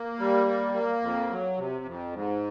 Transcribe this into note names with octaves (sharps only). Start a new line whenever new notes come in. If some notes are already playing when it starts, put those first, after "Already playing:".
Already playing: A#3
G3
A#3
A#3
F2
F#3
C3
F2
G#2